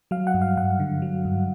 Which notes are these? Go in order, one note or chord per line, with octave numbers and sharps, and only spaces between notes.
F#3 F5
F#5
G2
F5
G2 F#5
D3
F#3
G2